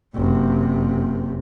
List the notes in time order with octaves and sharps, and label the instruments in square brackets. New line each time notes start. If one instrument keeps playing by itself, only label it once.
[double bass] F#1 C3